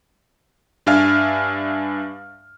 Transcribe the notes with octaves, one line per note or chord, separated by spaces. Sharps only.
G2 D4 E5 F5 G#5 F6